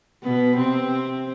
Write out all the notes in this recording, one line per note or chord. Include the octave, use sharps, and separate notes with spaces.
B2 B3
C3 C4